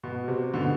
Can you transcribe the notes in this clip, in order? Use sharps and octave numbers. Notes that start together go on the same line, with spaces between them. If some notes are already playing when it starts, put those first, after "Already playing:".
B2
C3
B2 D3